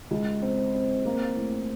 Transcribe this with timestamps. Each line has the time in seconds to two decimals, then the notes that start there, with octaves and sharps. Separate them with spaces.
0.11 C#2
0.42 C4
0.74 C4
1.05 A#3
1.37 A2